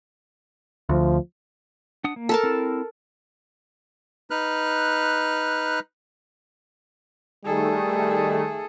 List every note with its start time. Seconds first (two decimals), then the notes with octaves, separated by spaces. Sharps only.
0.89 D2 F3
2.04 D4 F#5 D#6
2.16 A#3
2.29 A4 A#4 A5
2.43 C4 E4
4.30 D#4 B4 F6 F#6
7.45 D#3 G3 A3 G#4 A4